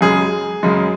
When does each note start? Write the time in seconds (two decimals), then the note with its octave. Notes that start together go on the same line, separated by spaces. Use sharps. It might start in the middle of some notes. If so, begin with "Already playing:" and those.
0.01 F#2 C#3 G#3 G#4
0.63 F#2 C#3 G#3